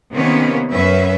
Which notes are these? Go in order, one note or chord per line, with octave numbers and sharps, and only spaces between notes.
C3 D#3 A#3 B3 C#4
F#2 C#4 B4 E5